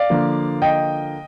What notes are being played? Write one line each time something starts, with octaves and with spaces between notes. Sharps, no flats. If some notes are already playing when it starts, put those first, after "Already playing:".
Already playing: D5 F5
D3 F3 A#3
D#5 G5